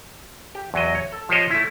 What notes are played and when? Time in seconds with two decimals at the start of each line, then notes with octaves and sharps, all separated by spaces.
0.55 G4
0.74 E2 F#3 D#5
0.95 C#5
1.12 A4
1.29 F3 G4 C5 C#5 D#5
1.50 A3 E4